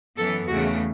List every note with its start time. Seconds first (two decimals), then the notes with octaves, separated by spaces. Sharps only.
0.18 F#2 E3 B3 A4
0.48 E2 C#3 E3 A3 F#4